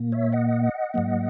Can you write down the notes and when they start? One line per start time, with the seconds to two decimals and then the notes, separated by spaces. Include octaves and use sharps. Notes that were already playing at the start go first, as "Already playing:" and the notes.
Already playing: A#2 A#3
0.12 C#5 E5
0.32 D#5 F#5
0.94 G#2 F#3 A#3